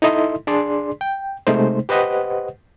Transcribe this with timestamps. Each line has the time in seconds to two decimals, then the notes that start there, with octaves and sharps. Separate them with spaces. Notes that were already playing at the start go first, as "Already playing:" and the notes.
0.02 D#4 E4 A4 D#5 E5 C6
0.47 D4 G#4 D5 C6
1.01 G5
1.47 C3 G#3 A3 D#4 C5
1.89 G4 B4 C5 D#5 F#5